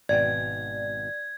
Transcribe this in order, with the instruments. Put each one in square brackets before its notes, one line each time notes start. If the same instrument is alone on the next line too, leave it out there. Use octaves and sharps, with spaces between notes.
[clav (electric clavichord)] G#1 B2 G5 [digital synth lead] D5 [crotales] G#6